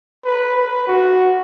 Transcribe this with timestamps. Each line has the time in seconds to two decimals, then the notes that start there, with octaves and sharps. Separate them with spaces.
0.25 B4
0.56 B4
0.87 F#4